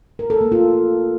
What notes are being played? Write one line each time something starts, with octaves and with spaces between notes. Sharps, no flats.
A#4
A4
A#3
F4